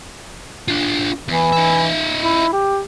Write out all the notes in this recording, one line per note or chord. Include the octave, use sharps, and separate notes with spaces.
D4 F4
E2 E3
D#4 E5
E4
G4